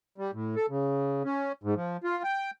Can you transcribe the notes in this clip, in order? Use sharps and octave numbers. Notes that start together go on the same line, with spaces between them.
G3
A2
A4
C#3
C#4
G#2
F3
F4
G5